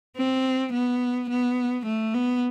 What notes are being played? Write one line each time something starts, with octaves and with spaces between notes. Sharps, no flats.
C4
B3
B3
A3
B3